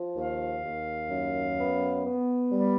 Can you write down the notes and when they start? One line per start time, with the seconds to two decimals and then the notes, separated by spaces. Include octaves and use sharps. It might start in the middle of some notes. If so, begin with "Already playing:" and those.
Already playing: F3
0.16 D#2 F5
0.63 D#2
1.10 F#2
1.58 B3
2.05 B3
2.52 G3